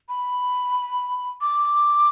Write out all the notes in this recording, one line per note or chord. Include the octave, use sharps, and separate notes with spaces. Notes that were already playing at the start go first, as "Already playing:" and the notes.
B5
D6